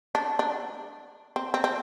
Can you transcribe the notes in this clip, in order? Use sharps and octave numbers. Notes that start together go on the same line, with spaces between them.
D4
D4
C4
C4
C4